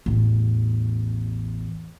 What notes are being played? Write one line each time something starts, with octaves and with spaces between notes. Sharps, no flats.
A1 E2